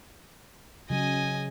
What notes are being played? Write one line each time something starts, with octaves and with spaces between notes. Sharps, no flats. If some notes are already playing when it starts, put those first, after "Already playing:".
C#3 F#3 D#5 G#5